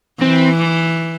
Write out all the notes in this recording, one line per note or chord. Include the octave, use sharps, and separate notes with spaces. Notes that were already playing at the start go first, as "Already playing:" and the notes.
E3 C4